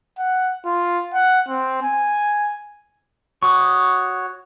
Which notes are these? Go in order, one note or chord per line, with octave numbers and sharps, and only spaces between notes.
F#5
F4
F#5
C4
G#5
F#4 C#5 C#6 D#6